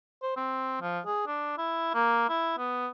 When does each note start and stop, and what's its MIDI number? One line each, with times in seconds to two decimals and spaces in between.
0.22 0.31 72
0.36 0.79 60
0.81 1.00 53
1.06 1.23 68
1.27 1.56 62
1.58 1.90 64
1.94 2.27 58
2.29 2.53 64
2.58 2.88 59